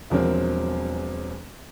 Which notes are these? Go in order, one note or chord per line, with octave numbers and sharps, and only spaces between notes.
E1 E2 F3 F#3 C4 A#4